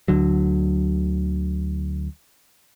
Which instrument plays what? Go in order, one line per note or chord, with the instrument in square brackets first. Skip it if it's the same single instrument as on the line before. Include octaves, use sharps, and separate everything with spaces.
[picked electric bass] D2 D3 F#3